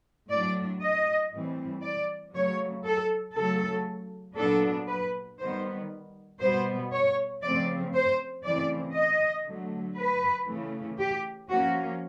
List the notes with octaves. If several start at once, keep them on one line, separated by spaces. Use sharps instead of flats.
A2 F#3 A3 D4 D5
D#5
A2 E3 G3 C4
D5
C#3 F#3 A3 C#5
A4
C#3 F#3 A3 A4
A#2 F#3 B3 D4 A4
B4
D#3 G3 B3 C5
B2 G3 B3 C5
C#5
C#3 F3 A3 C4 D5
C5
C#3 E3 A3 C4 D5
D#5
D3 F#3 A3
B4
C#3 E3 A3
G4
F3 A#3 C#4 F#4